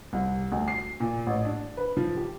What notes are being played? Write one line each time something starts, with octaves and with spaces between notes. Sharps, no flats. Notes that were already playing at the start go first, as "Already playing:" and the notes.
C2
D2
C7
A#2
A1
D4
B4
F3
G4